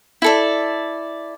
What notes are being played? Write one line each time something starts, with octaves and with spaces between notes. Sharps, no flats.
E4 A4 D5